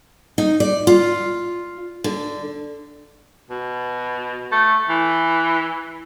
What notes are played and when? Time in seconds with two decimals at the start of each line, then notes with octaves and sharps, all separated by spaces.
0.38 D#4
0.60 D5
0.87 F4
2.04 D3
3.50 B2
4.52 A3
4.89 E3